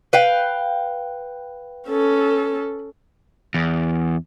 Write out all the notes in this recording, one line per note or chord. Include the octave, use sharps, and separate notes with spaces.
B4 F5 G5
C#4 A4
E2